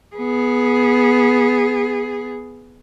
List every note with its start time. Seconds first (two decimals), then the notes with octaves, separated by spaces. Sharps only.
0.16 B3 G#4